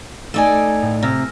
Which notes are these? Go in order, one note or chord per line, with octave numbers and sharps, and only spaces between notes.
A3 D#4 D5 G#5 D6 E6
A2
C3 E6 F6 A#6